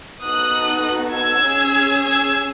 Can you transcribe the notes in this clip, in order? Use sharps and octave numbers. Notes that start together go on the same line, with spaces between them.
B3 D#4 F#4 A4 D#6 F#6
E6 G#6
C#4 G#4
E6 G#6